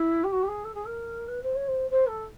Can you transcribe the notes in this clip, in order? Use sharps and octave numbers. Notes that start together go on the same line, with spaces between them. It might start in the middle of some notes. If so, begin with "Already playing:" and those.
Already playing: E4
G4
F#4
G4
G#4
A4
G#4
A#4
B4
C5
C#5
C5
C5
A4